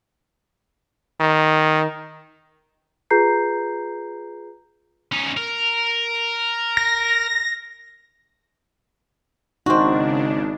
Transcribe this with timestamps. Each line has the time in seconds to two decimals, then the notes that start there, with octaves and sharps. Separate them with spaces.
1.20 D#3
3.10 F4 G#4 B4 A#5 G6 C7
5.12 C#4 D#4
5.37 A#4
6.77 A#6
9.66 G#1 C#3 C4 D4 D#4 F#4